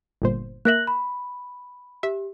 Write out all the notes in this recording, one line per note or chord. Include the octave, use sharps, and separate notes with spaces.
G1 A#2 C5
A#3 A#4 E5 F#6 A#6 F#7
B5
G4 E5